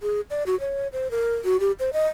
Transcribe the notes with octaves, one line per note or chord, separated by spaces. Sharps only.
G#4
D5
F#4
C#5
C5
A#4
F#4
G4
C5
D#5